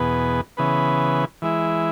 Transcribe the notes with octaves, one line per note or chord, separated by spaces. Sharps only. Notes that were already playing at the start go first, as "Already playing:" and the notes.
Already playing: E2 B2 B3 G#4 B4
C#3 E3 B3 G#4 B4
E3 G#3 E4